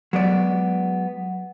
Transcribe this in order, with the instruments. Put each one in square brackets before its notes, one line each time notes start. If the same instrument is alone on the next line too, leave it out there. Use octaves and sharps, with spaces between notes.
[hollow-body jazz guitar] F#3 G#3 B3 D5